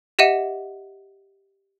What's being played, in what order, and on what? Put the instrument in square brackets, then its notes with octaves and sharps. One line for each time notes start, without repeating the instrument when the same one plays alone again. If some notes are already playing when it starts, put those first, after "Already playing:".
[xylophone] G4 D#5 E5 F#5 D#7